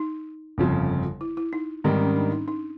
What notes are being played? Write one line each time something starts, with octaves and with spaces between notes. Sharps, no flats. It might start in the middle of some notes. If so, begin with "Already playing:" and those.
Already playing: D#4
G1 F2 C#3 F3
E4
E4
D#4
G#2 D#3 G3 C4
C#4
D4
D#4
D#4